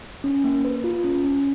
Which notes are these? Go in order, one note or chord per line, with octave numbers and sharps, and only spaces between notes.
C#4
A#3
B4
F4
C#4
C#4